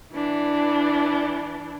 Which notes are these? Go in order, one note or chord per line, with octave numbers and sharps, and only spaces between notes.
E3 D4